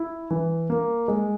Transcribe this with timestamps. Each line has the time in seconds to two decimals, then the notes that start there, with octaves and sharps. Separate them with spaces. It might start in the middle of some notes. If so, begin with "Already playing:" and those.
Already playing: E4
0.30 E3
0.70 A#3
1.08 G#3